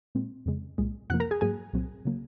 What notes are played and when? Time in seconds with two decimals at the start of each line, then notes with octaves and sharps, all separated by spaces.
0.15 A#2 G#3 C4
0.46 F2 C#3 G#3
0.78 C2 A#2 G#3
1.10 F2 C3 F3 A#3 F#5 F#6
1.20 A#4 A#5
1.31 G#4 G#5
1.41 G#2 F#3 A#3 G#4 G#5
1.73 C2 A#2 F#3 C4
2.05 C#3 F#3 A#3